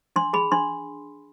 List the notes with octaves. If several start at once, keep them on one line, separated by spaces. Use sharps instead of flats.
D4 C6
G#4 B5
D4 C6